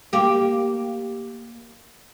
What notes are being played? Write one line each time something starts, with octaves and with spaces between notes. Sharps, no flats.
A#3 G4